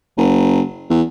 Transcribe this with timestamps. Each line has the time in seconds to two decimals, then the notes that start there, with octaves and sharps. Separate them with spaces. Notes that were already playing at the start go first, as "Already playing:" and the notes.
0.17 F#1
0.90 E2